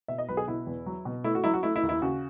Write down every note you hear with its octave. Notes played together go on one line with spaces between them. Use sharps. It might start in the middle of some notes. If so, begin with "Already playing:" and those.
B2 E5
D#5
B1 B4
G#4
B2 E4
E2
F#3
B2
A3 E4
F#4
F#3 E4
F#4
A3 E4
E4
D#2
E4
C#3 F#4